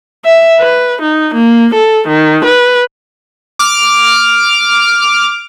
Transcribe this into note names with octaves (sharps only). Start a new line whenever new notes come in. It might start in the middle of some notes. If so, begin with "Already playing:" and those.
E5
B4
D#4
A#3
A4
D#3
B4
D6 F6